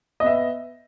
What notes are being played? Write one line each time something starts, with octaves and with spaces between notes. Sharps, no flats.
B3 D#5 E5